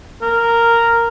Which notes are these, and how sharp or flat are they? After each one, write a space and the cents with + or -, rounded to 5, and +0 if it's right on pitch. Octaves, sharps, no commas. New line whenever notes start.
A#4 -5